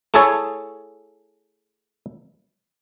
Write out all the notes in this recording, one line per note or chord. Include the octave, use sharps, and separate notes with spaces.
A3 E4 G#4 A4 C#5